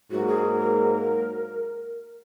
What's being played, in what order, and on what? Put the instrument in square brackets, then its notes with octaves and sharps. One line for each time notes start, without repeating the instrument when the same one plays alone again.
[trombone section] G#2 F#3 A#3 [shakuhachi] F#4
[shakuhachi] G#4
A#4